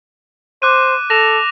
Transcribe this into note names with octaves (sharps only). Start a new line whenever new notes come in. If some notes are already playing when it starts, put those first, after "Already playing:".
C5 D6 F#6 D#7
A4 A#6 E7 F7